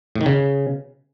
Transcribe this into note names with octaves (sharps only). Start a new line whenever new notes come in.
A2
D#3
C#3